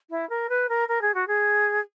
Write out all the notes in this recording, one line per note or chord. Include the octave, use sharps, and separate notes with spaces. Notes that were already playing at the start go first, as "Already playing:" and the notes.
E4
A#4
B4
A#4
A#4
G#4
F#4
G#4